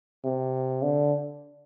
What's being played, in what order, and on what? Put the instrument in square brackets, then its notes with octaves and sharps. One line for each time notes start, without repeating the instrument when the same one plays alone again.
[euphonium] C3
D3